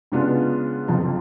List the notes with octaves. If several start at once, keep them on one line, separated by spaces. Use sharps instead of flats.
C#3 G#3 B3 D4 F4
F#1 F2 F3